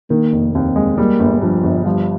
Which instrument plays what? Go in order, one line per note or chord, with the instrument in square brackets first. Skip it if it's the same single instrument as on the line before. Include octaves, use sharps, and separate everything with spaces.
[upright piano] D#3 [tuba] A#3
[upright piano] F1
[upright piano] D#2 [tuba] C4
[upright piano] G#3
[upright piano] G3 [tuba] A#3
[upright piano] G1
[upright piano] G2 [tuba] F3
[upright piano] G1
[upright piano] F3 [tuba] G3